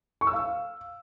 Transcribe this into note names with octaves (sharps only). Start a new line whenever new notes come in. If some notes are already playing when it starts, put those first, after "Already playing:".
C#6
E6
F5